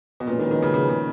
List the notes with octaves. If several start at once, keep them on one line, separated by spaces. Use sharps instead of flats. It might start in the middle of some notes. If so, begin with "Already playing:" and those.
B2
A#2 F3 G#3 C#4 F#4 B4
D#3
D#3
C#3
C#3
C#3